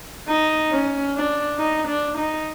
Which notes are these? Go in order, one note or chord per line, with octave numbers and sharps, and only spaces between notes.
D#4
C#4
D4
D#4
D4
D#4